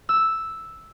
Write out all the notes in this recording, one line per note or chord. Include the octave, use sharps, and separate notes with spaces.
E6